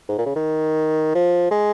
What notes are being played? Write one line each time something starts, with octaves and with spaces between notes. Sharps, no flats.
G#2
A#2
C#3
D#3
F3
G#3